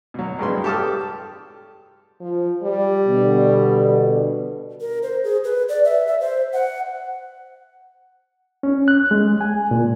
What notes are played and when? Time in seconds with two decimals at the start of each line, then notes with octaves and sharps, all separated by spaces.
0.14 B2 F#3
0.39 C2 G2 G#3 B4 C6
0.64 G4 A4 A5 D6 D#6 F6
2.21 F3
2.63 G3
3.07 B2 D3
4.81 A#4
5.03 C5
5.24 G#4
5.44 B4
5.69 D5
5.85 E5
6.07 E5
6.21 C5
6.53 F#5
8.63 C#4
8.88 F#6
9.11 G#3
9.41 G#5
9.71 A#2